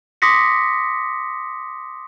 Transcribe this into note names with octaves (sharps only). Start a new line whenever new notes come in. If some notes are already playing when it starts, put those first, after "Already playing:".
C6 D6 D#6 A#6 B6 C#7